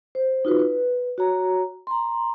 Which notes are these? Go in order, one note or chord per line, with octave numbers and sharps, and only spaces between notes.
C5
D#4 F4 F#4 B4
B4
F#4 C#5 A#5
A#5 C6